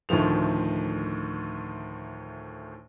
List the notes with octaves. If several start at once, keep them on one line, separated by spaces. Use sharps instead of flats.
D2 A2 D#3 F3 F7